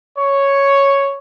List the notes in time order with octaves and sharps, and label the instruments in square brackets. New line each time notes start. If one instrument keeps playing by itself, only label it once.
[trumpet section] C#5